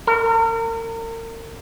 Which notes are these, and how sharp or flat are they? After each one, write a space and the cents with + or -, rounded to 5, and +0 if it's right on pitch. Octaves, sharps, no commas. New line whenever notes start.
A#4 -35